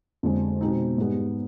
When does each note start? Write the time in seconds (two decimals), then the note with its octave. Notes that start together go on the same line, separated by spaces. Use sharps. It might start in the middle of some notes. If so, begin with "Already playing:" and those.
0.23 F2 D3 G#3
0.61 B2 G#3 C4 D#4
0.98 G#2 G3 B3 D#4 G#4